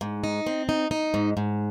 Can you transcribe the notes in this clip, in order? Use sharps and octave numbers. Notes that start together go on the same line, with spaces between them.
G#2
D#4
C4
D#4
D#4
G#2
G#2